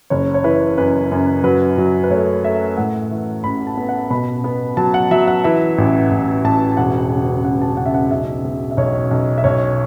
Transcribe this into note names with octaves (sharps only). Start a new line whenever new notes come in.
F#1 C#5
C#5
E3 B4
F#2 B4
F#2
F#3 B4
F#3
B4
A3 C#5
A3 E5
A2 F#5
E3
A1 B5
A5
B3
F#5
B2 B5
B3
F#3 A5
F#5
F#3 E5
F#5
E3 E5
A1
A1
A1 A5
E1 F#5
C#3
E1 F#5
A5
C#3 F#5
E5
F#5
B1 E5
B2
E5
B1 C#5
B1
E5
B1 C#5